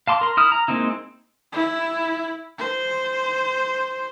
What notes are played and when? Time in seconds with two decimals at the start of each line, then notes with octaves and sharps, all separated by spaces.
0.07 F5 A5 C6 D6
0.21 A#4 C6
0.37 E4 D#6 F6
0.52 A#5
0.68 G#3 A#3 C4 D#4 E4
1.52 E4
2.58 C5